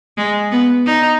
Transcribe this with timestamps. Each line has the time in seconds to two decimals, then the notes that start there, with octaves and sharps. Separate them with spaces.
0.17 G#3
0.51 B3
0.86 D#4